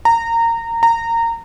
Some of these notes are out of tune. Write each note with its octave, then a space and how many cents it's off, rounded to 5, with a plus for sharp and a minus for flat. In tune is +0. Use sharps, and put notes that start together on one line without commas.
A#5 -20
A#5 -20